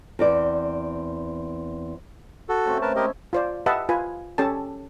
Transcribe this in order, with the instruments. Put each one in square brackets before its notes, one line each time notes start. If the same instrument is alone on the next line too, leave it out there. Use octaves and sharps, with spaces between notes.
[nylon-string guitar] E2 C4 D5
[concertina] F#4 A4
[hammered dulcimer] C#3 A3 C4
[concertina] A#4 B4 A5
[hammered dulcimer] G#3 C#4 E4 [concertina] G4 A#4 D#5
[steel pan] F4 C5 D5
G4 B4 D#5 E5 F#5 A5
F4 B4 G#5
C#4 G4 A4 A5